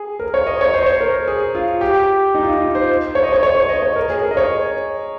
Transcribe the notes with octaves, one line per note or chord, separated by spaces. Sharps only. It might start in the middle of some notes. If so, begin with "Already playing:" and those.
Already playing: G#4
A#4
C#5
D#5
C#5
C5
C#5
C5
A#4
G#4
F4
G4
D#4
F4
D#4
F4
C5
C#5
D#5
C#5
C#5
C#5
D#5
C#5
A#4
G#4
A#4
D#5
C#5